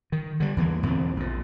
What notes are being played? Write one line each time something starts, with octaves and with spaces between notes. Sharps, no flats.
D#3
D3 G3
E2 E3 A#3
E2 B2 D3 C4
A#1 A#2